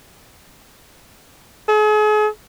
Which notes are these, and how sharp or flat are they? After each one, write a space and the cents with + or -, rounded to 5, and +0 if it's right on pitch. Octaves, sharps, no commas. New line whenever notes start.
G#4 +40